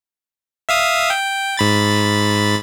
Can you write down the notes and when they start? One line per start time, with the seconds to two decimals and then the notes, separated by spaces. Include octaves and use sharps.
0.69 E5 F5 D#6
1.10 G5
1.57 G#2 B5 A6